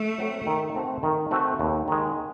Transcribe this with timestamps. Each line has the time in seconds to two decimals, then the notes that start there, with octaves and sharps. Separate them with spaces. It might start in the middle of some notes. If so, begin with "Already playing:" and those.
Already playing: A3
0.18 F#3 C4 F#4
0.46 D#3
0.74 A3 C4 F#4
1.03 D#3
1.31 A3 C4 F#4
1.59 D#2
1.88 D#3 G#3